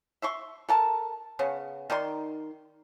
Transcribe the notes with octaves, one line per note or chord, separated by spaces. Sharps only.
E5 C6 C#6
A4 A#4 A5
C#3 B3 C#4
D#3 D#4 D5 C6